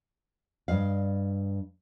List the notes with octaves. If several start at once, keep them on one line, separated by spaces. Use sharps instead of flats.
G2 D#5 F5